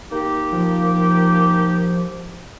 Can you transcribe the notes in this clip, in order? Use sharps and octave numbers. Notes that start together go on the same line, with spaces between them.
A#3 D#4 G4
F3